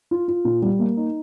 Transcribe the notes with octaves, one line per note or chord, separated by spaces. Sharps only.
F4
F4
A#2
G3
A#3
D#4